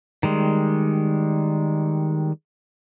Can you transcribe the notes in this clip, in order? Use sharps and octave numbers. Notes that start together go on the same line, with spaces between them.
D#3 G3 G#3